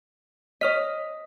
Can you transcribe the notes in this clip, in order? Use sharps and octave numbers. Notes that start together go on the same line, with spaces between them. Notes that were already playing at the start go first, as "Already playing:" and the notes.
C#5 D#5 F6 B6